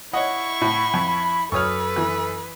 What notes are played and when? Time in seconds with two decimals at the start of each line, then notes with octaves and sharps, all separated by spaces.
0.13 E4 C#5 D#5 F#5 C#6
0.61 A2 B5
0.94 F2
1.52 F#2 A4 B4 C#5 C#6 D#6 F6
1.96 E3